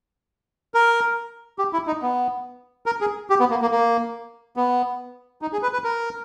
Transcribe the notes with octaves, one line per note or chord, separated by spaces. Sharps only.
A#4
G4
E4
D#4
B3
A#4
G#4
G4
B3
A#3
A#3
A#3
B3
D#4
G#4
B4
B4
A#4